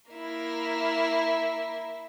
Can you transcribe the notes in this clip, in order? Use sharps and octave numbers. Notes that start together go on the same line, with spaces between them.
A#3 E4